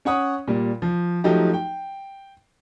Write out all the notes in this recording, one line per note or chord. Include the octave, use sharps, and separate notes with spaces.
C#4 C#5 F#5 D#6
A#2 G3
F3
F3 F#3 A3 D#4 G4
G5